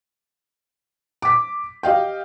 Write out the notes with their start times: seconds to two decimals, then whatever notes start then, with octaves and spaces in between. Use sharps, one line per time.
1.22 D6 B6
1.83 G4 D#5 F5 G5